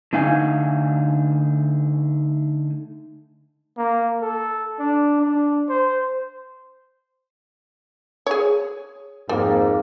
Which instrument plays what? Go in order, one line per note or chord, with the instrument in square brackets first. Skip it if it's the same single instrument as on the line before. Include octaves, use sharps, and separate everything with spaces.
[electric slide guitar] D3 A3 D#4 F5 G#5
[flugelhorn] A#3
A4
D4
D4
C5
[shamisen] G#4 C#5
[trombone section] F2 G#2 A#3 [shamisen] G3